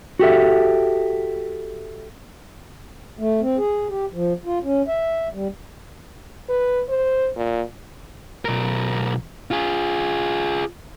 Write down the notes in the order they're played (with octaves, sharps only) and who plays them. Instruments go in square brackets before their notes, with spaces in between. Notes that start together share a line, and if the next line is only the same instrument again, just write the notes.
[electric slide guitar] F#4 G4 A4 E5
[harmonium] A3
C4
G#4
G4
F3
F4
C#4
E5
G3
[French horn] B4
C5
A#2
[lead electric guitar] B1 A#4
F4 G#4